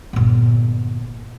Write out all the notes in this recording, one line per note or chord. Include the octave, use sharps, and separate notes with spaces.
G1 A#2